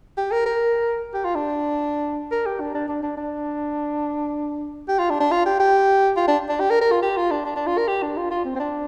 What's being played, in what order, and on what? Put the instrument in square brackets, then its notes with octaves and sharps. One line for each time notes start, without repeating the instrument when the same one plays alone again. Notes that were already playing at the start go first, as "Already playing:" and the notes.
[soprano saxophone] G4
A#4
A#4
G4
F4
D4
A#4
G4
D4
D4
D4
D4
D4
G4
F4
D4
D4
F4
G4
G4
F4
D4
D4
G4
A#4
A#4
F4
G4
F4
D4
D4
D4
F4
A#4
G4
D4
F4
F4
C4
C4
D4